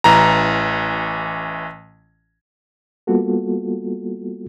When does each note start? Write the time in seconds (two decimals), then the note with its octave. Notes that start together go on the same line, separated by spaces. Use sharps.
0.04 A1 E3 A#5
3.07 G3 A#3 B3 F4 F#4 A4